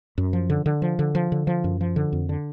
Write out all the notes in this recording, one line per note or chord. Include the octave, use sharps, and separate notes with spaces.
F#2
F3
D3
D3
F3
D3
F3
D3
F3
F#2
F3
D3
F2
D3